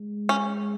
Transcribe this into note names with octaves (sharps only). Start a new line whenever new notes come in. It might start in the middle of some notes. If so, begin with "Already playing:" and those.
Already playing: G#3
C#4